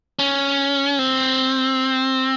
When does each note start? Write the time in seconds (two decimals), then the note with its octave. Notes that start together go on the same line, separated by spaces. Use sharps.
0.19 C#4
0.99 C4